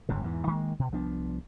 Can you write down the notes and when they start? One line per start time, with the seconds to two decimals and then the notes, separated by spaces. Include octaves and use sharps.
0.09 G1 F2 G#2 C#3
0.21 E2 G#2 E3
0.47 D#3 G#3 A#3
0.79 B2
0.92 C2 F3 B3 D4